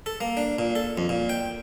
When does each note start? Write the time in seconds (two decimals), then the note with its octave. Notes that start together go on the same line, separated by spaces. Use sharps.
0.06 A4
0.21 A#3
0.37 D4
0.59 A#2
0.75 A4
0.98 F2
1.09 A#2
1.29 G5